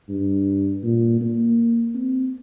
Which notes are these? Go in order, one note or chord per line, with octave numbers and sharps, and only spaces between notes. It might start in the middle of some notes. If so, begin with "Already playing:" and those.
G2
A#2
A#3
C4